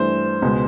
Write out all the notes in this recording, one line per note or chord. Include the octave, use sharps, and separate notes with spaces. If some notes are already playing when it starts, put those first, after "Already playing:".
Already playing: G2 E3 A3 C5
C#2 B2 G#3 B3